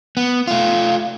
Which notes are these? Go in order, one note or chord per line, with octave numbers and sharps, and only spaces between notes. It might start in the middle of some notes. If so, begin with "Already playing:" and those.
B3
A3 F4